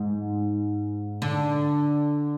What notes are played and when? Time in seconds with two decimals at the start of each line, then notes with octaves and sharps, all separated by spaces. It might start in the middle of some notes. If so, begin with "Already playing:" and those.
Already playing: G#2
1.22 D3